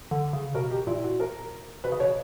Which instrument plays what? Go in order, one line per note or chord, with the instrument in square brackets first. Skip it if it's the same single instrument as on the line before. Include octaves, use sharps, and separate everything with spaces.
[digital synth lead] D3
C#3
[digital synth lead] B2 [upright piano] A#4
[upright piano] G4
[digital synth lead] A#2 [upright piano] E4
[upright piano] F#4
A#4
[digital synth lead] B2 [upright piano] B4
[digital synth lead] C#3
[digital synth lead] B2 [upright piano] C#5